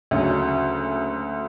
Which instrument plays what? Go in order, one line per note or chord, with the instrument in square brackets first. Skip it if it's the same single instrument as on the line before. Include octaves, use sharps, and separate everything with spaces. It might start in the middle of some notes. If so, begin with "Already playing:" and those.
[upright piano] D2 C#3 F#3 C#4